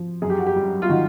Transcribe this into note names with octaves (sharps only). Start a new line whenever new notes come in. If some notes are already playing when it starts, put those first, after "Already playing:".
Already playing: F3
F#2 G#4
G4
F#4
G4
G3
F4
D#3 F#4